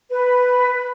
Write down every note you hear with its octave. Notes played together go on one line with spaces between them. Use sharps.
B4